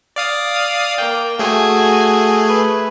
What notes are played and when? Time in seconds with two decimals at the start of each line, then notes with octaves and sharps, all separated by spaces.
0.16 D5 F5 D#6
0.98 A#3 G5
1.39 A3 F#4 G#4 G#5
2.46 B4